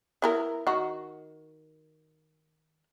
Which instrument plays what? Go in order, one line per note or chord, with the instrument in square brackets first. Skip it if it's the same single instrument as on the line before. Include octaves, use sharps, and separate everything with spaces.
[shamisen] B3 E4 A#4
D#3 F#4